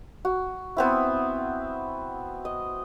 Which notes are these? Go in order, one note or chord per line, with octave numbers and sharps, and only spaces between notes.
F#4
B3 C4 E4
D#5